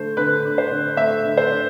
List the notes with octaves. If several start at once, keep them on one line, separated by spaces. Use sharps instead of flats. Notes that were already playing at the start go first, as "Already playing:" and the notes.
Already playing: D3 A3 C5
D3 B4
D4
C5
D3
A3 E5
D3
C5
D4